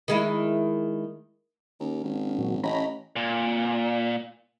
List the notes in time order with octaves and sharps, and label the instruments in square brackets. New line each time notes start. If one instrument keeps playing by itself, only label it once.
[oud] D#3 G#3 E4
[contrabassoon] D#2 [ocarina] C#4
[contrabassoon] G#1
[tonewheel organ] A#2 F#3
[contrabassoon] A1 [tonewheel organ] C#4 A#5 B5 [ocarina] D#5
[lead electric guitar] A#2